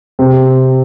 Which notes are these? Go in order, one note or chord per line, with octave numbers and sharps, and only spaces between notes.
C3 C4